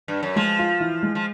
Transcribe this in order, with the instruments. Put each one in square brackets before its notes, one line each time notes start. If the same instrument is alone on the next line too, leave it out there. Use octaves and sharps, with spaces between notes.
[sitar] G2
F#2
[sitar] F3 [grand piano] G#3
[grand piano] F4
E3
G#3
[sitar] F3